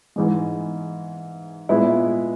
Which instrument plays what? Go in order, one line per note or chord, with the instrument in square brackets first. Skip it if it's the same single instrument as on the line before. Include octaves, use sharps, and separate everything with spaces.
[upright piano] G#2 E3 G#3
A#2 G#3 B3 E4